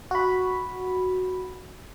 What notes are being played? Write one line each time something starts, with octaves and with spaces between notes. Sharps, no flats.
F#4 B5